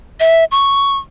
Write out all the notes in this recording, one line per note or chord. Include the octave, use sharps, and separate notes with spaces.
E5
C#6